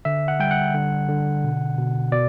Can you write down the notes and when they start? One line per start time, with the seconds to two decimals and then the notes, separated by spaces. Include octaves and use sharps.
0.05 D3 E5
0.28 F#5
0.40 G3 G5
0.51 F#5
0.75 D3
1.08 D3
1.44 B2
1.78 B2
2.12 B2 D5